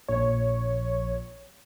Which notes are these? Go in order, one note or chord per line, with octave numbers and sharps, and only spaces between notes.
A#1 C#5